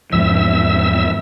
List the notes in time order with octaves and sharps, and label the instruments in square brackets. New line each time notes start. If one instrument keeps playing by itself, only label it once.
[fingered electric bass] E2 G#2 F3 [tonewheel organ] E5 E6